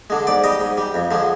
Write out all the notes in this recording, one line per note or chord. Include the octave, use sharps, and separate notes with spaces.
D3 G#3
G#2 D5
G3 D#5
G#2
G3
F2
D3 F3 G#3